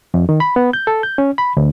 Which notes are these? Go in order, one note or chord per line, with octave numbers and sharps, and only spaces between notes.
F2
D#3
B5
B3
G6
A4
G6
C#4
B5
D2